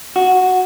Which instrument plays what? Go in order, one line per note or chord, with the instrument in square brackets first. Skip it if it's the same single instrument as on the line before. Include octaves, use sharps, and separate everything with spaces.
[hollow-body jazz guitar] F#4